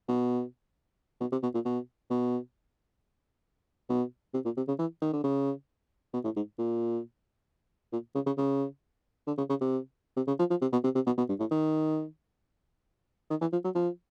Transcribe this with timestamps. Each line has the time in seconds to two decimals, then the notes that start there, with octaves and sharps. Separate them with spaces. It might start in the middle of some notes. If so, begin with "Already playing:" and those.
0.08 B2
1.21 B2
1.32 C3
1.43 B2
1.54 A#2
1.65 B2
2.10 B2
3.89 B2
4.34 C3
4.45 A#2
4.57 C3
4.68 C#3
4.79 E3
5.02 D#3
5.13 D3
5.24 C#3
6.14 B2
6.24 A2
6.36 G#2
6.59 A#2
7.93 A#2
8.15 C#3
8.26 C#3
8.37 C#3
9.27 D3
9.38 C#3
9.50 C#3
9.61 C3
10.16 C3
10.28 C#3
10.39 F3
10.50 F3
10.62 C3
10.73 B2
10.84 C3
10.95 C3
11.06 B2
11.18 B2
11.29 G2
11.40 A2
11.51 D#3
13.30 D#3
13.41 E3
13.53 F3
13.64 F#3
13.75 F3